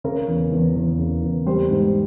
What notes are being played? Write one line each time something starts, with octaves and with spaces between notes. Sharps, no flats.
C#3 A#4
E2
E2
E2
C#3
E2
G3 C5
G#2